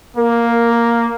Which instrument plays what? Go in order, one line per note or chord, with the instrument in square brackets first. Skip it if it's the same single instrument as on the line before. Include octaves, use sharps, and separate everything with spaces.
[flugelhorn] A#3 [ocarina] A#4